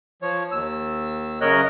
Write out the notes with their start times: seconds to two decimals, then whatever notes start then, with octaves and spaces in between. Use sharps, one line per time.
0.22 F3 C#5
0.51 D#2 E6
1.41 F#2 C#3 A#4 C#5 D#5 F#6